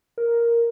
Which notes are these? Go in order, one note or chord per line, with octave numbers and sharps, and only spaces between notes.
A#4